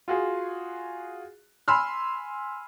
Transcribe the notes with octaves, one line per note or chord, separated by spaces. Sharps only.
F4 F#4 G#4
G#5 B5 C6 E6 F6